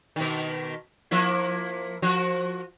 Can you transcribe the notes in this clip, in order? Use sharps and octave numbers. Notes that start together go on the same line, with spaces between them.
B2 D#3
F3 A#3 E4
F3 F#4